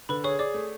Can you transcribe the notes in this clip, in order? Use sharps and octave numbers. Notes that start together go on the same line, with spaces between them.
D3 B4 B5
G#4 C#5 C#6
G#4 D5 D6
A3